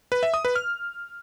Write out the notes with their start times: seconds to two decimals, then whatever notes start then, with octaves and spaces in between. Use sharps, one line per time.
0.12 B4
0.23 E5
0.34 D#6
0.45 B4
0.56 F6